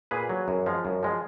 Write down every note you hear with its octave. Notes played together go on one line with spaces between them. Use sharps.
A#2 G#4 B4
F#3
F#2
F3 G#3
F#2
F3 G#3